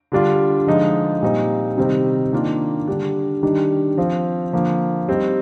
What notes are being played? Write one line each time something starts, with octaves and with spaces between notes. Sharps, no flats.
D3 G3 D4 F4
D3 F3 G#3 D#4
A#2 G3 C4 D#4
C3 D#3 G3 C4 D#4
D#3 A#3 D4 F4
D3 G3 D4
D#3 G3 D4
F3 C4 F4
D3 F3 A#3
G3 C4 D#4